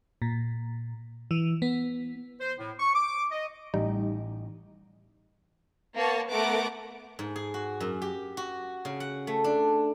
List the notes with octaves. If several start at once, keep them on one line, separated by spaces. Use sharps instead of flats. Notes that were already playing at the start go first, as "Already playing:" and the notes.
A#2
E3
B3
C5
A2
C#6
D6
D#5
A1 G3 D#4
A#3 B3 C#5 A5
A3 B3 A#4 F#5 D6
G#2
G#4
F#4
F#2
G4
F#4
C#3
F#5
A3
D4